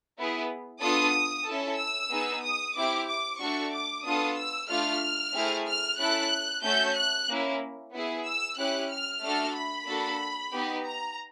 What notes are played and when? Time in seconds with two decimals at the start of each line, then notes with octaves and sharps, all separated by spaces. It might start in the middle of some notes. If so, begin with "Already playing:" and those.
0.17 B3 E4 G#4
0.82 B3 D4 F4 A4 D#6
1.47 C#4 E4 A4
1.79 E6
2.11 B3 D#4 G#4
2.44 D#6
2.76 C4 E4 G4 D6
3.08 D6
3.40 A3 D4 F#4 A4 C#6
3.73 D6
4.05 B3 D4 F4 A4 D#6
4.37 E6
4.69 A3 D4 F4 F6
5.35 A3 C4 E4 G#4
5.67 F6
5.99 C#4 E4 A4 F#6
6.64 A3 C#4 F#4 A4 G6
6.97 F#6
7.29 A#3 C#4 E4
7.94 B3 E4 G#4
8.26 E6
8.58 C#4 E4 G4 F#6
8.91 F6
9.23 A3 D4 F#4 A4 F6
9.55 B5
9.87 A#3 D4 F#4 A4
10.53 B3 D#4 G4
10.85 A#5